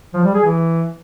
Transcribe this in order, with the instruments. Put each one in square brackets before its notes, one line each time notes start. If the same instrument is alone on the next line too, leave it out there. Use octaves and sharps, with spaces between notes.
[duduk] F3
G3
G#4
E3